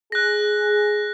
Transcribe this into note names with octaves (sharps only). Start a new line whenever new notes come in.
G#4 F#6 A#6